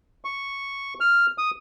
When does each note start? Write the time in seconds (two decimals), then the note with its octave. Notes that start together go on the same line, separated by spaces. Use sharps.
0.25 C#6
1.00 F6
1.38 D#6